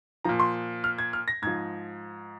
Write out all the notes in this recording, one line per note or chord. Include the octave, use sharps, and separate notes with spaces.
A#2 F3 A#5
C6
F6
G#6
F6
A#6
G#2 F3 G#6